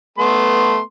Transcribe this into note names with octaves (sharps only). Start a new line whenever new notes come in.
A3 B3 C6